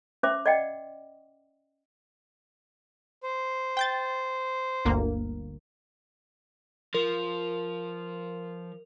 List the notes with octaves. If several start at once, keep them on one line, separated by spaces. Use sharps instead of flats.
C#4 C5 E5 D6
D5 D#5 F#5 G5
C5
G5 G6 A6
G1 D2 A#3
F3 A#4 F7